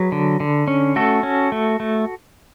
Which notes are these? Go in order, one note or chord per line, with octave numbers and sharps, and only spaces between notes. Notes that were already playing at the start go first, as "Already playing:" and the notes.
Already playing: F#3 G#4 B4
D3
D3
C#4
A3 F#4 A4
C#4
A3
A3